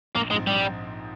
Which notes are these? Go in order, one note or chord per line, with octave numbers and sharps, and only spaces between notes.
A#1 A#3
G#2 F3 G#3 C4
A#1 G3